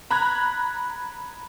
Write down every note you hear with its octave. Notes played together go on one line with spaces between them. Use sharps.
A#5 B5 F#6 G#6